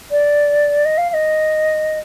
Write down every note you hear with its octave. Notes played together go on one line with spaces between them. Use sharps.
D5
D#5
F5
F5
D#5